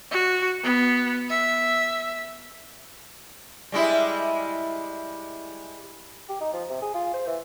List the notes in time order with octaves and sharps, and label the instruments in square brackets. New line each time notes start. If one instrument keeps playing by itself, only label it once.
[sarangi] F#4
B3
E5
[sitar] G3 G#3 E4
[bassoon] G4
D#4
F3
C3
G#4
F4
C5
E3